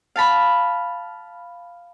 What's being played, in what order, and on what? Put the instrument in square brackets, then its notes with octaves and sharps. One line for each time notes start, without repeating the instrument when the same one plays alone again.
[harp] F5 A5 B5